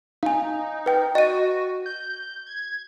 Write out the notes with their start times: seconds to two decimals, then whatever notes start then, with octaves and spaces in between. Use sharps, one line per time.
0.23 D#4 F5 G#5
0.86 B4 G5 G6
1.15 F#4 D#5 D#7
1.86 G6
2.47 G#6